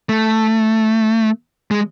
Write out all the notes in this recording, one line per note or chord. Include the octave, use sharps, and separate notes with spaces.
A3
G#3